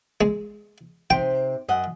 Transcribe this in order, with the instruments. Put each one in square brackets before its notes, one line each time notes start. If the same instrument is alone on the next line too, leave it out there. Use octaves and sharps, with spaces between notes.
[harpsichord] G#3
[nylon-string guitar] C3 D#4 C5 [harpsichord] G5
[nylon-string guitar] F#2 D#5 F#5